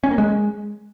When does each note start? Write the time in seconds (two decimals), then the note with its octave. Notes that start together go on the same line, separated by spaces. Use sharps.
0.04 C#4
0.11 A#3
0.18 G#3